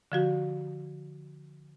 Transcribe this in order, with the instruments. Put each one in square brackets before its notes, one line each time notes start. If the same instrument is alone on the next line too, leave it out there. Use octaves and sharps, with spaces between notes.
[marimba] D3 F3 F#4 G4